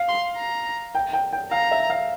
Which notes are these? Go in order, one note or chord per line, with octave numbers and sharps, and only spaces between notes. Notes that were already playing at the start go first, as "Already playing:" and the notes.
Already playing: F5
C6
A#5
G5
G5
G5
F5 A#5
E5
F5